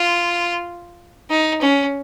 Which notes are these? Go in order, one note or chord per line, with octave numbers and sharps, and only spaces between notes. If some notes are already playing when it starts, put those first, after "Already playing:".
Already playing: F4
D#4
C#4